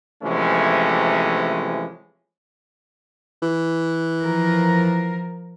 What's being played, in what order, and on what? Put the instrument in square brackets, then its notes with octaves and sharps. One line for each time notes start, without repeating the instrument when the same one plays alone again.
[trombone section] C3 E3 F3 G#3 A3 C#4
[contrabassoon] E3
[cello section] F3 A#4